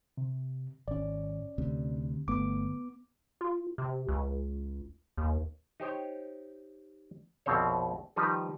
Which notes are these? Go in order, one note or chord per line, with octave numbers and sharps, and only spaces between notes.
C3
G#1 C#4 D5
D2 C3
G1 A3 B3 D6
F4
C3
C#2
D#2
D#4 G4 C5 C#5
A#1 F2 B2 C4 C5 C#5
D#3 F3 G3 D#4 G4 B4